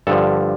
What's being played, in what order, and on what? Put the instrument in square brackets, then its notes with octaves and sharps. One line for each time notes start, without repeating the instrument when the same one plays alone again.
[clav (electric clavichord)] G2 D3 F3 A4